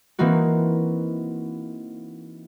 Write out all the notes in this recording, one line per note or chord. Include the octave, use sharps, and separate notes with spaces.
E3 A#3 C4 D#4 F#4